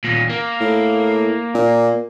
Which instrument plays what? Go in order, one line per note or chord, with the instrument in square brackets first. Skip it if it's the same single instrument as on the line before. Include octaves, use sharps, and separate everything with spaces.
[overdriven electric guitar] D#2 A#2
A#3
[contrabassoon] A2
A#2